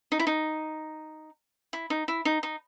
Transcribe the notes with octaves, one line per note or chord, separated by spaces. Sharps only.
D#4
E4
D#4
E4
D#4
E4
D#4
D#4